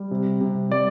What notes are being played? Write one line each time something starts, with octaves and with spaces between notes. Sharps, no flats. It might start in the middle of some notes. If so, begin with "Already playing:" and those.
Already playing: G3
C3
C3
G3 D5